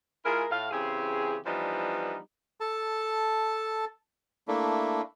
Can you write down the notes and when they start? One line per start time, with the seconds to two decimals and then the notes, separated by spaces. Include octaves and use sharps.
0.25 G#3 E4 F4 G#4 A#4
0.50 A2 F5
0.71 C#3 E3 C4 G4 G#4
1.45 E3 F3 G3 B3 D4 D#4
2.60 A4 A5
4.48 A3 A#3 D4 E4